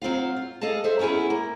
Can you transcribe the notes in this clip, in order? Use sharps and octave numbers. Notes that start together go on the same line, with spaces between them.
F#3 C4 F4 F5
F4
G#4 A4 D#5 F5 A5
G#4 C5 E5
F#3 B3 C#4 E4 G#4
A#3